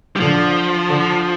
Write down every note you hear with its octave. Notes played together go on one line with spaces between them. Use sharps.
G3
D3 F3
D3